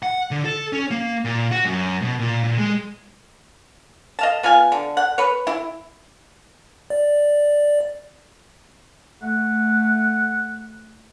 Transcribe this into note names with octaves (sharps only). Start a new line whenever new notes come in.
F#5
D3
A4
C#4
A#3
A#2
F#4
F#2
B2
A#2
A#2
G#3
D#5 F5 A5
B3 F4 F5 G#5
D3
F#5
B4 C#5
E4
D5
A3 F#5